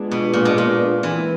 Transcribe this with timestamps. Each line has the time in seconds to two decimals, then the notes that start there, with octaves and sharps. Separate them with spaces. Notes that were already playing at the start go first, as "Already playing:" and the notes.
Already playing: G#3 B3 D4 F4 G#4
0.11 B2
0.33 A#2
0.45 B2
0.58 A#2
1.02 E3 G#3 C4 E4